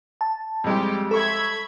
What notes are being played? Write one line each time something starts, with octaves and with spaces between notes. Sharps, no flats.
A5
F2 G3 G#3 G4
A4 E5 B5 C#6 G#6